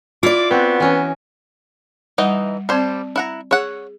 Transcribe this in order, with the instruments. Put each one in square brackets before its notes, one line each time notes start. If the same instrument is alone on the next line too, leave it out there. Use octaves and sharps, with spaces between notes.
[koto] E4 E5 [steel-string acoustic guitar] F4 D5 [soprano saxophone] D6
[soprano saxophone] B3 [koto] C4 F#4
[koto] E3 C#4 D#5
[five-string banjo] E3 D#4 D#5 [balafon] G3 F#5
[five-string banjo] G3 C5 [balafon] C4 D5
[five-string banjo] E4 F#5 A#5
[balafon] G#4 [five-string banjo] C#5 F#5